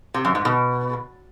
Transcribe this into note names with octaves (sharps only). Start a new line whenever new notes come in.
C3
F#2
G#2
B2